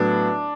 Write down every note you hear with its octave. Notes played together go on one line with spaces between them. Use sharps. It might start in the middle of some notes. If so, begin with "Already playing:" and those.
Already playing: A2 F#3 B3 D4